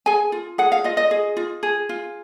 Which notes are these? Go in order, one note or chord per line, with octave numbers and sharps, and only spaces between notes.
G#4 G#5
F4
G#4 F#5
F5
F4 D#5
D#5
G#4
F4
G#4
F4